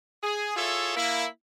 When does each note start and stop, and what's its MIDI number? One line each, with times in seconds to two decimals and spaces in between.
0.23 0.55 68
0.56 0.95 64
0.56 0.95 65
0.56 0.95 68
0.56 0.95 69
0.56 0.95 73
0.56 0.95 76
0.96 1.26 58
0.96 1.26 64